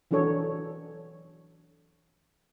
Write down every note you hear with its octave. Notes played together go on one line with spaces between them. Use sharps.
E3 F#3 D4 A4 C#5